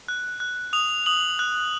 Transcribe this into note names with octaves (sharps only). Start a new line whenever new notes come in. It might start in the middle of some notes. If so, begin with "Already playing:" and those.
F#6
F#6
D#6 F7
D#6 F#7
F#6